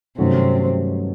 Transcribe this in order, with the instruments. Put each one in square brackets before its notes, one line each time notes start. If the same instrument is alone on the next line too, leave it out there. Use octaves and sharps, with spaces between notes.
[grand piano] G2 D#3 F#3 A3 C#4 [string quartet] C3 C4